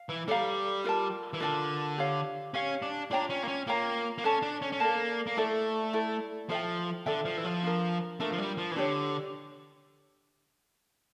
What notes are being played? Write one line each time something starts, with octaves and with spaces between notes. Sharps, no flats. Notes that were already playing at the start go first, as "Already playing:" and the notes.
Already playing: F5
E3
G3 A4 D5 F5 A#5
F4 A#4 D5 A5
E3
D3 F4 A#4 D5 A5
G4 C#5 F5
C#4 G4 C#5 F5
D4
D4 F4 C#5 G5 A#5
C#4
A#3
C#4
A#3 F4 C#5 G5 A#5
A#3
C#4 A4 D5 A5
D4
C#4
C#4
A#3 A4 D5 A5
A#3
A3 E4 A4 D5
E4 A4 D5
F3 A4 E5 G5
D3 A4 E5 G5
F3
E3
F3
D4 F4 A#4
A3 D4 F4 A#4
F3
G3
F3
E3
D3 D4 G4 C#5